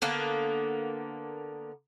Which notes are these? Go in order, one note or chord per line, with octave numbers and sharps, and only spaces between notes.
D3 A#3 B3